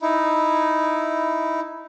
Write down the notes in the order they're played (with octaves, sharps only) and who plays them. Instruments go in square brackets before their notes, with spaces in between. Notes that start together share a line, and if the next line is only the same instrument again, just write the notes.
[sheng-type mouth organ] D#4 E4